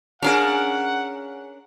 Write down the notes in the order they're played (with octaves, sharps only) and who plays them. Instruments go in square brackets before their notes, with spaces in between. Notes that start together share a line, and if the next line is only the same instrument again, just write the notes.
[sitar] C#4 D4 A#4 [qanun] G#4 F5 A#5 [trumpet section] F#5